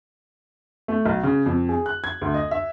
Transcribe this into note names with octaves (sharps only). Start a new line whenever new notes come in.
A3
B1
C#3
F2
G#4
F#6
G#6
D2
D#5
E5